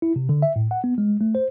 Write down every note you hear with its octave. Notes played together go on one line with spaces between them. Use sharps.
E4
C3
D3
E5
A2
F#5
B3
G#3
A3
C5